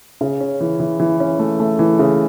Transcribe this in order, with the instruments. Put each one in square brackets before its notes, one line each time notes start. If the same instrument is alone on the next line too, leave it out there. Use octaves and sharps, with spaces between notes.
[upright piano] C#3
C#4
E3
E3
E3
C#4
A3
A3
E3
C#3